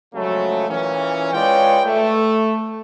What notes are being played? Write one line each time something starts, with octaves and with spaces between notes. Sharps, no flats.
C#3 F3 F#3 G#3 A3
A#2 E3 C#4
G#3 F4 B4 C#5 D5 G5
A3